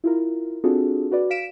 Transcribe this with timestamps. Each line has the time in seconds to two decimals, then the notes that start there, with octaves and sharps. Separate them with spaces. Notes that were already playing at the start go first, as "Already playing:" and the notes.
0.04 E4 F4 A#4
0.64 C4 D4 F4 F#4 G#4 A4
1.12 F#4 B4 D5
1.30 F5 B6 D7 E7